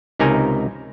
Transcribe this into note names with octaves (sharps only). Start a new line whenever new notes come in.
C#2 C3 D#4 A#4 G#5